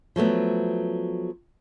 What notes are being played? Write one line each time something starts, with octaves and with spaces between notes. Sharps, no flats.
F3 F#3 A3 B3